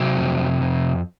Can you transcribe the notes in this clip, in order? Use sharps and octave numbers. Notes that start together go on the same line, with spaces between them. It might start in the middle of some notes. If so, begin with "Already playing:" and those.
Already playing: C3 F#3 C4
F2
F2